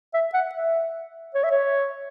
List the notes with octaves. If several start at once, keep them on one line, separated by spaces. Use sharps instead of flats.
E5
F#5
E5
C#5
E5
C#5